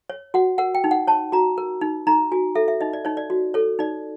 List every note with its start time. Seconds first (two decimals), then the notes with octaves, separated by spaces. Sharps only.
0.10 C#5
0.34 F#4 F#5
0.58 A#4 F#5
0.75 G5
0.84 D#4
0.91 F#5
1.07 C#5 A5
1.32 F#4 A#5
1.58 A#4
1.81 D#4
2.07 D#4 A#5
2.32 F#4 G#5
2.55 A4 E5
2.68 E5
2.81 D#4 D#5
2.93 D5
3.05 D#4 C#5
3.17 D5
3.30 F#4
3.54 A4 C#5
3.79 D#4 D5